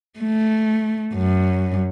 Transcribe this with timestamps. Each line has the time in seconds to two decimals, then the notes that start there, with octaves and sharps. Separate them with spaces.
0.19 A3
1.14 F#2